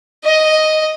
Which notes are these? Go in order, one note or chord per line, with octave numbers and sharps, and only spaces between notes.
D#5